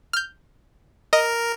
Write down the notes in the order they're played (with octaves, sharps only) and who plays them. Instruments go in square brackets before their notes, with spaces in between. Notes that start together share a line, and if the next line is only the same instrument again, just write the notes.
[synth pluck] F6 G6
[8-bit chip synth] A#4 [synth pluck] D#5